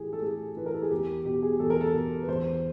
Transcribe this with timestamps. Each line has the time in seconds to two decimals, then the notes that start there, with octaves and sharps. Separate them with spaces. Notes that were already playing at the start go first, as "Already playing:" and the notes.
Already playing: A2 E3 G4 G#4
0.13 A4
0.22 A2 G#4
0.57 E3 B4
0.66 A#4
0.74 A4
0.82 G#4
0.91 E2 G4
1.25 B2 G4
1.42 G#4
1.60 E2 A4
1.70 A#4
1.81 A4
1.94 B2
2.22 B4
2.28 E2 C5